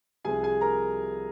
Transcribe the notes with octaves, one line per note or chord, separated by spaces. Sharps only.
C2 C3 F3 G#4 G#5
G#4 G#5
A#4 A#5